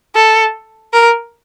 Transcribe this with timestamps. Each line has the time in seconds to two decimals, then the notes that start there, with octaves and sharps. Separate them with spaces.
0.16 A4
0.93 A#4